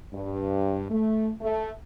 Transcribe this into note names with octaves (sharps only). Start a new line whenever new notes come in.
G2
A3
A3